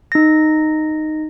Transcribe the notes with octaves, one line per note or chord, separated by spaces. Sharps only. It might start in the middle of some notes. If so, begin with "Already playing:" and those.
D#4 A#6